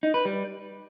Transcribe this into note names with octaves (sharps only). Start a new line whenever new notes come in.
D#4
B4
G3